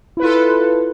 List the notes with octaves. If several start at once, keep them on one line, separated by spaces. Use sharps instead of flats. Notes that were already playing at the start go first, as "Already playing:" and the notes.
E4 F4 A4 B4